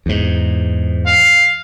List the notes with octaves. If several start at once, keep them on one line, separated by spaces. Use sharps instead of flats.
E2 G#2
F5